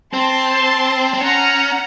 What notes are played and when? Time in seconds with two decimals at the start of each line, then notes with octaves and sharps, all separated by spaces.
0.13 C4 A5 C6
1.14 C4
1.21 C#4 F#5 A#5